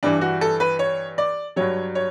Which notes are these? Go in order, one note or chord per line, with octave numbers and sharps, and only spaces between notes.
G2 E3 D4
F#4
A4
B4
C#5
D5
G2 F#3 C#5
C#5